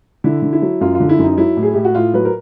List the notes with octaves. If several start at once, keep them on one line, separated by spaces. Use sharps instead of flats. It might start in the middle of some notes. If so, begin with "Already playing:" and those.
D3 E4
D3
E4
F#3
F#2 F4
F4
D3
E4
F#2
D#4
F#3 E4
A2
G#4
A2 G4
F#4
A2 F4
F#3 B4
A#4